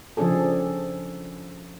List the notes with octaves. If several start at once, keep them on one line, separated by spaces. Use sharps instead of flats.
C#3 F3 C4 D4 G#4 A4